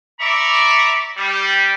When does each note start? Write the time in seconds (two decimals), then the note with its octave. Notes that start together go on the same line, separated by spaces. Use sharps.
0.21 D5 E5 A#5 B5 C#6 D6
1.17 G3